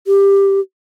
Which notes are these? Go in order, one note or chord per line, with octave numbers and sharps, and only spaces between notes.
G4